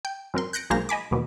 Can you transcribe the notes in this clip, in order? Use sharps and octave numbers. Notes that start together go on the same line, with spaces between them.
G5 G6
F#2 C4 A#4 C6
F#6 G6 A#6 C#7 D7
B1 G#3 A#3 C5 F5 A#6
D#5 G#5 B5 D6
D#2 B2 E3